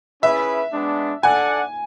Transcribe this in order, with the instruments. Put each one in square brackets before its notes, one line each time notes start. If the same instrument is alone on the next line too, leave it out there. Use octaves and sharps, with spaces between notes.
[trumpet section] C#4 E4 G#4 B4 [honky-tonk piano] E5
[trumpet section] G#3 B3 D4
[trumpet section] D4 A4 D5 F#5 [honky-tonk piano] G#5